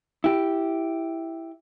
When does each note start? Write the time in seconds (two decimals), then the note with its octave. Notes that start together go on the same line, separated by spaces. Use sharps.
0.24 E4 G4